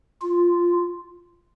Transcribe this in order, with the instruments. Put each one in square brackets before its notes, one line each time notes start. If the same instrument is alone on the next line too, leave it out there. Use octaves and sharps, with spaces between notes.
[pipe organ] F4